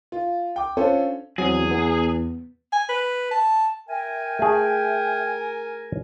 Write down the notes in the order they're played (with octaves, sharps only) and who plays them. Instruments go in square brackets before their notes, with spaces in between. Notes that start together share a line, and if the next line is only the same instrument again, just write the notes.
[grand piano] F4
G5 D6
C#4 D4 F4 A4 C5 C#5
[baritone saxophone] E2 [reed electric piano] F#3 C4 [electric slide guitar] G#4
[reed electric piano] B3
[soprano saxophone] G#5
B4
A5
[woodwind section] A#4 G#5 [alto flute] E5 [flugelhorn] G5
[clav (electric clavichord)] A3 G#4